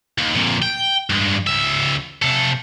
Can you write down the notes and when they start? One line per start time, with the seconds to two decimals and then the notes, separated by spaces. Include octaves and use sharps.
0.18 D#2
0.35 F2 A#2
0.62 G5
1.10 G2 G#3
1.47 C#2 E5
2.22 C3 A4